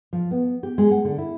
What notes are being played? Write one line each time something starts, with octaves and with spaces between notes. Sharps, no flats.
F3
B3
G4
G#3
F#5
D3
E4